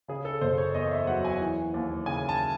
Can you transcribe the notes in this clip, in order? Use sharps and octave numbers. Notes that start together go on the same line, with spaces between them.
C#3 G#4
A4
F#1 C5
C#5
E2 D#5
E5
F#3 F#5
G#5
E3
D#2
C#3 G#5
A5